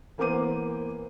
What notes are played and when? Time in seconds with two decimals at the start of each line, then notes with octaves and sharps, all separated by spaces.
0.18 E3 A#3 B3 C5 D6 D#7